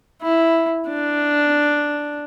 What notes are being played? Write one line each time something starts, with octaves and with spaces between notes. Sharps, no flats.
E4
D4